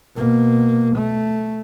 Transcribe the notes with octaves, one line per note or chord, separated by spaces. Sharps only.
B2 A#3
A3